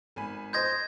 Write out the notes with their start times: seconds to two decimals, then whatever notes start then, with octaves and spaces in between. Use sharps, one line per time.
0.16 G#1 G#5 B5
0.53 C5 D#5 C6 G6 G#6 A#6